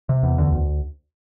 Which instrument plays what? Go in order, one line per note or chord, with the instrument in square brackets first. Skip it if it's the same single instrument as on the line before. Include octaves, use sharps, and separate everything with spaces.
[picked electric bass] C3
E2
D2
D2